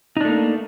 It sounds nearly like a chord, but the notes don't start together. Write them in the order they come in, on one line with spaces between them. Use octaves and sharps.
D#4 D4 A3 A#3